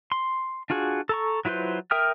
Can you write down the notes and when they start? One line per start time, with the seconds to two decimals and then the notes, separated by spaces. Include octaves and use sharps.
0.12 C6
0.70 D4 F4 F#4 G#4
1.09 A4 A#5 C#6
1.45 F#3 E4 F4 B4 C5
1.91 A#4 E5 G5 D#6 F6